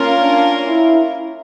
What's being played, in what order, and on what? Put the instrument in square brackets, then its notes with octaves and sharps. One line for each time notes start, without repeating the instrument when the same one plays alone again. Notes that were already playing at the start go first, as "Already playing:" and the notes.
Already playing: [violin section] A#3 C#4 F4 A#4
[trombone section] D4
E4